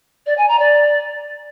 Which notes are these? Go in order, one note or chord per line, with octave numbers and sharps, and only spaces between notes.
D5
G#5
A#5
D5